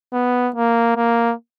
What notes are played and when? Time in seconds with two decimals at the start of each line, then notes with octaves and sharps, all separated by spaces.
0.13 B3
0.56 A#3
0.97 A#3